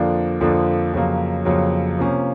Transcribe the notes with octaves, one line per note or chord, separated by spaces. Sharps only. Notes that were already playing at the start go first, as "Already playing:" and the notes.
Already playing: F2 D3 F3 A#3 D4
F2 D3 F3 A#3 D4
F2 C#3 F#3 A#3
F2 C#3 F#3 A#3
C3 F3 A#3 C#4